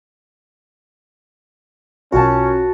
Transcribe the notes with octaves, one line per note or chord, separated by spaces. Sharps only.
B1 C#4 F4 F#4 A#4 A5